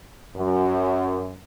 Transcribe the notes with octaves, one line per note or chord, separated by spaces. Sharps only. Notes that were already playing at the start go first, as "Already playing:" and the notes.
F#2